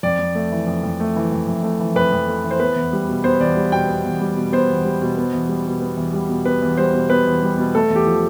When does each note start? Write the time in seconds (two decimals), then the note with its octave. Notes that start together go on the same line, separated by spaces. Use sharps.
0.03 F2 D5
0.19 F2
0.35 A3
0.52 E3
0.67 F2
0.83 F2
1.00 A3
1.16 E3
1.32 F2
1.47 F2
1.63 A3
1.80 E3
1.96 F2 B4
2.13 F2
2.28 A3
2.44 E3
2.51 C5
2.60 B3 B4
2.76 E2
2.93 G3
3.09 B2
3.24 B3 C5
3.40 E2 D5
3.57 G3
3.72 B2 G5
3.88 B3
4.05 E2
4.21 G3
4.37 B2
4.52 B3 C5
4.70 E2
4.85 G3
5.01 B2
5.17 B3
5.33 E2
5.49 G3
5.66 B2
5.81 B3
5.97 E2
6.13 G3
6.29 B2
6.46 B3 B4
6.62 E2
6.77 G3 C5
6.94 B2
7.10 B3 B4
7.26 E2
7.43 G3
7.58 B2
7.75 A3 A4
7.90 E2
7.96 G4
8.06 F3